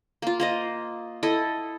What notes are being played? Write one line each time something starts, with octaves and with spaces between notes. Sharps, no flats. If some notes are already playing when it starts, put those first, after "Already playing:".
A#3 F4
A#3 C5 D#5
E4 A4 D#5